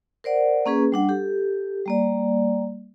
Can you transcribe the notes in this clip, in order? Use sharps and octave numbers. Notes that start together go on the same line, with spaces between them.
A#4 C5 D5 F#5
A#3 C#4 G#4 B4
G3 D4 F#5
G4 A4
G3 A#3 D5